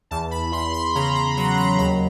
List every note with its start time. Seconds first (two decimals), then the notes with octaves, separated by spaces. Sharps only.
0.11 E2 A5
0.31 B5
0.52 E2 C6
0.73 B5
0.95 C#3 A#5
1.15 B5
1.37 F#3 A#5
1.57 A#5
1.78 D#2 B5